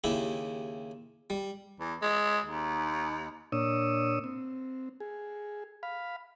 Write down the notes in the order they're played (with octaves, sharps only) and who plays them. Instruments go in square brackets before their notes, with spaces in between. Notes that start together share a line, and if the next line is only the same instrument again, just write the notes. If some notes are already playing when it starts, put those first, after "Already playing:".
[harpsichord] D#2 C#3 E4 G4
G3
[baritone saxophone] E2
G#3
D#2
[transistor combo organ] A#2 D4 C#5 D#6 E6
C4
G#4
F5 B5